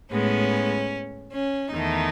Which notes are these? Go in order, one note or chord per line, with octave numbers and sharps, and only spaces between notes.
A2 G#3 B3 C#4
C#4
E2 D#3 A3 D#4